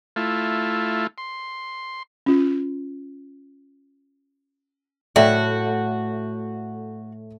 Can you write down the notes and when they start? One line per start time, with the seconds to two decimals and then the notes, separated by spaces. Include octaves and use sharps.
0.16 A3 E4 F4
1.18 C6
2.26 C#4 F4
5.16 A2 A3 F#4 D5 E5 G5